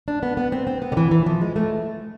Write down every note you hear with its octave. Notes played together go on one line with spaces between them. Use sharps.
D4
B3
B3
C4
C4
B3
D3
E3
E3
F3
G#3
A3